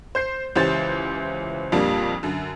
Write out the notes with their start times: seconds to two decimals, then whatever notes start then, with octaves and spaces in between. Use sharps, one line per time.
0.15 C5 G6 C7
0.56 C#2 E3 C#4 G4 C5 A6
1.72 F2 A#2 G3 A#3 D4
2.23 F#2 D3